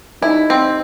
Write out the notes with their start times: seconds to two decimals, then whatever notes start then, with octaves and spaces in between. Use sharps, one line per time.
0.22 D#4 E4 G4 D#5
0.50 C4